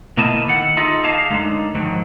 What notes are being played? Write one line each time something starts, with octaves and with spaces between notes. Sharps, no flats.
B2 A#3 E4 D#5 A5
D#3 A4 F#5
D#4 F4 G#4 A4 D#5
G4 G#4 D#5 F5 A5
F#2 D3 G#3 D#4
G#2 D#3 F3 F#3